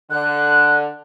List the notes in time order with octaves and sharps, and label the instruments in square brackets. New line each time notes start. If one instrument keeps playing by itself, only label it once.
[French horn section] D3 [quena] F#6